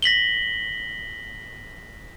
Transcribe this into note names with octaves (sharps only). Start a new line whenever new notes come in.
A#6 B6 F#7 G7